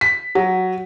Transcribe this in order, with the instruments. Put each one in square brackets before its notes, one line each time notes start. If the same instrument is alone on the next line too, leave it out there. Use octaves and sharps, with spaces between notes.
[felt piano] B6
F#3